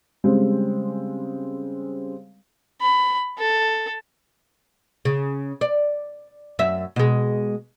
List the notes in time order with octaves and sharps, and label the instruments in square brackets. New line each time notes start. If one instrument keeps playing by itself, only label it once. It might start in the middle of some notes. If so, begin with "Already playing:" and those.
[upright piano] C#3 G3 G#3 C4
[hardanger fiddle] B5
A4
[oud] C#3
D5
F#2 E5
B2 G#3